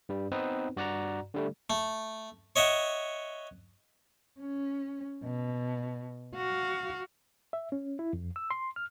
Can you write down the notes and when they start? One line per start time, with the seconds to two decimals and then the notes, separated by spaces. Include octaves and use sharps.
0.09 G2 G3
0.32 B3 C4 D#4 B4
0.76 G2 F#4 D5 F#5 A#5
1.34 D3 G3 A3
1.70 A3
2.56 C#5 D#5 E5 F#5
4.40 C#4
5.24 B2
6.35 F#4 F5
7.53 E5
7.72 C#4
7.99 E4
8.13 F2
8.36 E6
8.51 C6
8.76 F6